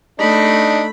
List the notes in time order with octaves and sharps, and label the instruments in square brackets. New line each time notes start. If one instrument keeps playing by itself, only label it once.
[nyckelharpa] A3 B5 [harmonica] D4 D#4